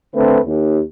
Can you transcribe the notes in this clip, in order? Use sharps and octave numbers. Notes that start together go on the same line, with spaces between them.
D3 A3 C4 B4
D#2